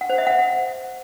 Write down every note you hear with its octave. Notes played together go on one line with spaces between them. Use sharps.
F#5
C5
E5
F#5